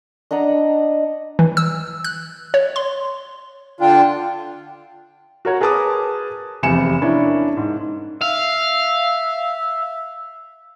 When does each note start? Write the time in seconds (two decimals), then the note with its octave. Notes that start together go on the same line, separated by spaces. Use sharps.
0.31 D4 D#5 F#5 A#5
1.39 E3
1.57 E6
2.04 F#6
2.54 C#5
2.76 C6
3.81 D3 D4 F4 G5
5.45 F#4 A#4 C#5
5.61 G#4 A#4 B4 A5 D6 D#6
6.63 F1 E2 C3 G#5 C#7 E7
7.02 A#3 C#4 D4 E4
7.57 G#2
8.21 E5 F5